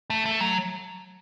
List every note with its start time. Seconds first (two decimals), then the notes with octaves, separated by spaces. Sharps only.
0.10 A3
0.26 A3
0.41 F#3